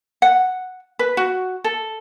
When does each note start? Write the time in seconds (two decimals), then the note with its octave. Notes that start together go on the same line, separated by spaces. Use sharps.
0.22 F#5
0.99 B4
1.17 F#4
1.64 A4